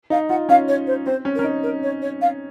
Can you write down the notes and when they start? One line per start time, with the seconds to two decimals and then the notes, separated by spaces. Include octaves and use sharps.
0.10 D#4 F5
0.29 F4 F#5
0.49 C#4 F5
0.68 C#5
0.87 C5
1.06 C4 C5
1.25 C#4
1.35 A#4
1.39 C#4
1.44 D#4
1.63 A#4
1.83 C#5
2.02 C#5
2.21 F5